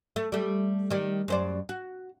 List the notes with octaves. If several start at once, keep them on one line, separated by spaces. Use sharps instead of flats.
A3
G3 A3
D#3 G3
F#2 C5 D5
F#4